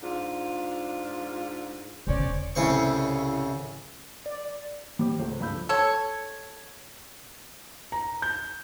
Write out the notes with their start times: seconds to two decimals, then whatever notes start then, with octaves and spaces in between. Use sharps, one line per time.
0.03 G#2 D4 F4
2.07 E1 D3 C#4 C5 D5
2.55 C2 A2 C#3 C5 C#6
4.26 D5
4.99 G3 C5 D6
5.19 C#2 A3 C5
5.40 D2 G2 F3 B5 E6 G6
5.69 A4 C#5
7.92 A#5
8.22 G6